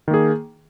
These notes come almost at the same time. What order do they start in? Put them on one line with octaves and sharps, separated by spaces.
D#3 A#3 G#4